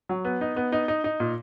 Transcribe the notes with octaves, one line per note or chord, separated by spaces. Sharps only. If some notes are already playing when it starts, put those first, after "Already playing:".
F#3
B3
D#4
B3
D#4
D#4
D#4
A#2